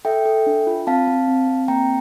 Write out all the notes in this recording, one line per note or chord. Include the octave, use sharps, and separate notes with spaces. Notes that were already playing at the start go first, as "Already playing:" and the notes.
A4 E5 G5
A4
D4
F4
C4 F5 A5
C4
C4
C4
A#3 G5 A#5